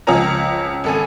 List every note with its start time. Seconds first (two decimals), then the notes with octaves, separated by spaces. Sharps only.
0.07 C#2 F3 C#4 A#5
0.84 G#1 A4 G#5